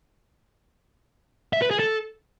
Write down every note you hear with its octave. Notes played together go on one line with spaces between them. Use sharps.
E5
B4
G#4
A4